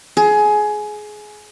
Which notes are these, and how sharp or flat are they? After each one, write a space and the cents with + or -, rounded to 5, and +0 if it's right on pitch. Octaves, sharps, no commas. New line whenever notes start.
G#4 +20